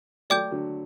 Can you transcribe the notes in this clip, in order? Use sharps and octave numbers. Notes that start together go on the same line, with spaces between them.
F#3 A3 D5 G5 D6 G6
D3 F#3